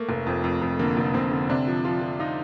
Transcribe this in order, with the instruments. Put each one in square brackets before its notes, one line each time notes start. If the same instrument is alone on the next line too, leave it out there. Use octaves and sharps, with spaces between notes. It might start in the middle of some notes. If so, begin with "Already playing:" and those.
Already playing: [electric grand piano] A3 [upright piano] A#3
[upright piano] F1
F2
F2
F2
[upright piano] D3 [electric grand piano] A#3
[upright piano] F1
[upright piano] F1 [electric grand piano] C4
[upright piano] D3
[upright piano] C3 [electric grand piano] D4
[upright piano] F3
[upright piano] F3 [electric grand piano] F4
[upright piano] F3
[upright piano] D#4 [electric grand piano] F4